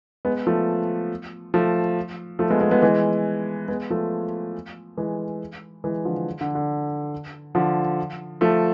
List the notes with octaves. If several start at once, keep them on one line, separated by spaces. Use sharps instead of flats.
G#3 B3
F3 A3
F3 A3
F3 A3
G#3 B3
G#3 B3
G#3 B3
E3 G#3
G#3 B3
F3 A3
E3 G#3
E3 G#3
D3 F3
D3
D3
D3 F3
F3 A3